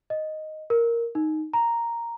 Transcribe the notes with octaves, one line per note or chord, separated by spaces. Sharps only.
D#5
A#4
D#4
A#5